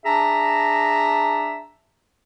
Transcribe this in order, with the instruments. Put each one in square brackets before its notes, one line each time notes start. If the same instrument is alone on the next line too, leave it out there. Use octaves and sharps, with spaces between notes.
[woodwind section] D4 G#4 E5 A5 A#5